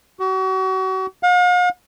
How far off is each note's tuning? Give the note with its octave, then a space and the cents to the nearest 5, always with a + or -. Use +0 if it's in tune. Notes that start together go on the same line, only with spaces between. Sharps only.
F#4 +35
F5 +45